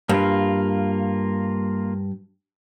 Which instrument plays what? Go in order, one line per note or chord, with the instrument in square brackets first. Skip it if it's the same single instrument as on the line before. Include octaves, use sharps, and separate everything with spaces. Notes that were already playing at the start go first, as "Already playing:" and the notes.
[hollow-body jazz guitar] G2 [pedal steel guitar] A#3 F4